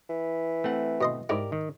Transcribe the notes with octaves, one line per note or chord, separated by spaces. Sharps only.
E3
A3 C4 F#5
B2 D#5 C6
G#2 E4 G4 A#4 D5
D#3